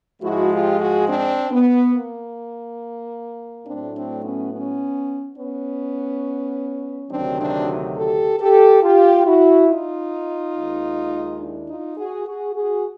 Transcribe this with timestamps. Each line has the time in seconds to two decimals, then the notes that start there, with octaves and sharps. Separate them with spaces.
0.21 G#2 F3 G#3 E4 F#4
0.50 F4 G4
0.79 F#4 G#4
1.07 C4 D4
1.51 B3
1.94 A#3
3.65 A2 F#3 A3 C4 D4
3.94 C4 D4
4.22 B3 C#4
4.51 B3 C#4
5.37 B3 C#4
7.09 D2 C3 D#3 F#3 C4 D4
7.38 C4 D4
7.96 G4 A4
8.39 G4 A4
8.82 F4 G4
9.25 E4 F#4
9.68 D#4 F4
10.54 D#2 D#3 G#3
11.39 D4 E4
11.68 D#4 F4
11.97 F#4 G#4
12.26 F#4 G#4
12.54 F#4 G#4